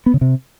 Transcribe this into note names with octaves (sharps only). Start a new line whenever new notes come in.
B3
C#3
C3